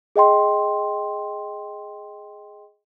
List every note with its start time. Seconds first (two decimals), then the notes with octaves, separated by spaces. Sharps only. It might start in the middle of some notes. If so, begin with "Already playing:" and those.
0.16 G#4 D#5 G5 C6